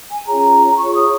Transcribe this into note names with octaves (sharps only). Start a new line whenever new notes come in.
G#5
C#4 F4 G#4 C#5 A#5
F4 G#4 C#5 C#6
D#6